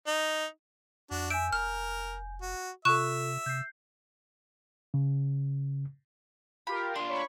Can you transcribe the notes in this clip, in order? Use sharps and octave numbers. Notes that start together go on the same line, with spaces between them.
D#4
F2 D4 F#4
E5 G#5 G6 D7
F1 A#4 F6
F#4
C3 F4 A4 E5 C#6 F#6 E7
C3 G6 C7
C#3
F4 G4 A#4 B5
D4 F4 C6
C#5 B5 C#6